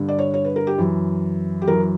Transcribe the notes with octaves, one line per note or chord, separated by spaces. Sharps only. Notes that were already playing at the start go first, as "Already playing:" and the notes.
Already playing: G2 D3
D5
C#5
C#5
B4
A#4
G4
F#2 E3
G4
F#2 E3 A#4